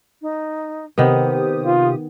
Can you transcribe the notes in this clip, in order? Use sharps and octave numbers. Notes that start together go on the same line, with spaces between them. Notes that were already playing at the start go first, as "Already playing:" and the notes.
D#4
C3 D#3 B3 G4 C5 D#6
F4